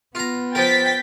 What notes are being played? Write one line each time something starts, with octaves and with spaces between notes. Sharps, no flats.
B3 F4 A#5
F3 A#4 G5 A6 B6